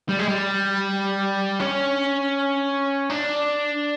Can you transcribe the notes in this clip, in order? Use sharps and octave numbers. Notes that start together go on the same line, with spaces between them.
G3
G#3
G3
C#4
D4